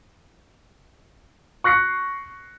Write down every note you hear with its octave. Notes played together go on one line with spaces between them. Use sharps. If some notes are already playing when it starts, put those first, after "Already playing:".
C#6 F#6 A#6 C7 C#7